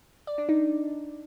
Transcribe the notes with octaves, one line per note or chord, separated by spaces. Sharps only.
D5
D4
D#4